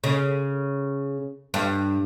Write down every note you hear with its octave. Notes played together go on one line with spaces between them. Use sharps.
C#3
G2